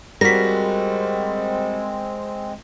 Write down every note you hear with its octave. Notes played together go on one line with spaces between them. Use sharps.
G3 G#3 C4 F#4 A#4 A#6 B6